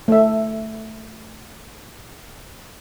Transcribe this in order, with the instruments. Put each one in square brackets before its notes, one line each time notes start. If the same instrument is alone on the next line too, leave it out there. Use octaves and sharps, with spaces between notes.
[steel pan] A3 E5